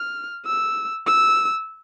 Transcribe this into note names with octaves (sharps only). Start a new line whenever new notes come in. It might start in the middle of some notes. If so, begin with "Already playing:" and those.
Already playing: F6
E6
E6